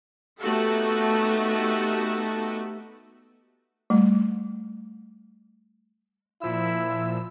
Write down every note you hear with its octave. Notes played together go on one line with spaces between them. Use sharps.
A3 B3 D#4 F#4 G4 A4
G3 A3
A#2 F3 E4 E6